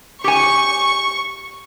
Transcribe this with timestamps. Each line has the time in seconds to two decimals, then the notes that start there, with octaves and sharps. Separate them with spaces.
0.24 G4 G#5 C#6